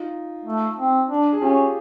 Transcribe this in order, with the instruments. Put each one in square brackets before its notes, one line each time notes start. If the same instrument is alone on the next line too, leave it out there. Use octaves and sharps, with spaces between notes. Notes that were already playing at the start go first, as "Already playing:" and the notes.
Already playing: [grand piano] D#4 F4
[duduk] A3
C4
D4
[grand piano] G#4
[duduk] C#4 [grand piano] F4 G4